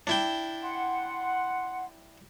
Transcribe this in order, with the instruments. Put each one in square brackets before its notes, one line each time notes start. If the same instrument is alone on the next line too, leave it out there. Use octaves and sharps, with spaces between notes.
[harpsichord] D4 E4 G5
[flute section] F#5 C6